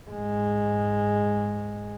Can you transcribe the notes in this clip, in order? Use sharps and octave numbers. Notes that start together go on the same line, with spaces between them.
G#2 G#3